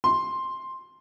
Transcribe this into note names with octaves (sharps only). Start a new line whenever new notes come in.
C6